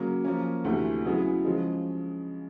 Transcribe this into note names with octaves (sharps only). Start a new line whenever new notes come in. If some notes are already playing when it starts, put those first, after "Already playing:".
Already playing: C#3 F#3 A#3
F3 A#3 C#4
D2 C3 E3 A3
C#3 F#3 B3 E4 G#4
C#3 F3 G#3